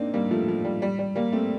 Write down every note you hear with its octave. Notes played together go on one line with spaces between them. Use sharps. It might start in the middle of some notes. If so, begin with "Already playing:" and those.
Already playing: A#3 C4 D4 D#4
G3 A#3
F3 A3
F3
G3
G3
G3
G3 A#3
A3 C4